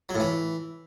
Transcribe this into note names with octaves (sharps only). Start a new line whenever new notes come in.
F#3
A2
E3